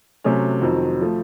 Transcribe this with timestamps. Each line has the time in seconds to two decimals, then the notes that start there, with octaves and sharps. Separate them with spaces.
0.24 C3 F#3 A3 C#4
0.62 F2 D#3 F#3 C4
1.01 F3 A3